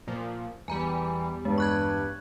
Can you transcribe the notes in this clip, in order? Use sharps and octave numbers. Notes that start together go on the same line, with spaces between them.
A#2 F3
E2 E3 G3 G#5 A#5
G2 G#3
C#6 F#6 G#6